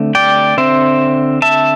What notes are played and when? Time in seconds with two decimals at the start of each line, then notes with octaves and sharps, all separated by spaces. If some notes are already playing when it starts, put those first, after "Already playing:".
Already playing: D3 A3 C4
0.15 D5 G5
0.57 D3 C4 C5 E5
1.42 E5 A5